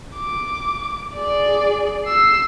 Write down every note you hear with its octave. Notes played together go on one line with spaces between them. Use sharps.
D6
G#4 D5
E6 C7